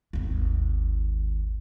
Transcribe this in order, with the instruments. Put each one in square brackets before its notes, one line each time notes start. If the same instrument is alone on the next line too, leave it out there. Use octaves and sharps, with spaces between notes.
[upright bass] G#1 D#2